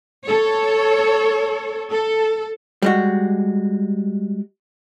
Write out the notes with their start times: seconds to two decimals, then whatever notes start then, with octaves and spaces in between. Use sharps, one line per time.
0.24 A4 C#5
1.91 A4
2.82 G3 G#3 F#4